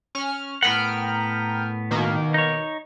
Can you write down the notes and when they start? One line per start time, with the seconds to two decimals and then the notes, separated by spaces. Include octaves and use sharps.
0.15 C#4 F6
0.63 A2 B3 A#4 F#5 G5 F6
1.91 B2 D#3 A#3
2.34 D#4 C#5